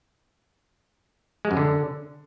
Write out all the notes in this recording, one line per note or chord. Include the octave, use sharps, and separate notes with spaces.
G#3
F#2
D3